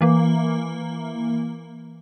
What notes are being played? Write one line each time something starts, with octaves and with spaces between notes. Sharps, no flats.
E3 A#3